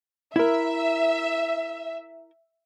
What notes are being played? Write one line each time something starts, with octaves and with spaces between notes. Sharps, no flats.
E4 A#4 E5